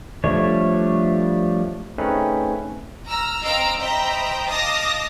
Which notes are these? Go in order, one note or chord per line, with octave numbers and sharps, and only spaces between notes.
F3 G3 A3 D4 C#5
A3 C4 C#4 D#4 G#4 B4
A#5 E6 F6
C4 D#5 F5 A#5 E6 D7
C5 D#5 E5 G5 A#5 B5
D#5 F5 A5 D6 D#6 A#6